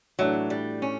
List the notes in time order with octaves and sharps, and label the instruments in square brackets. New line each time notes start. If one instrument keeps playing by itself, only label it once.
[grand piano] A2 E3 A3 D4 [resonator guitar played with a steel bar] F#3
[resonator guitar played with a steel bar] G3
C#4